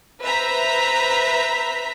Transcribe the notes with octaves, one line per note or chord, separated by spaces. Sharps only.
B4 C5 E5 A#5 B6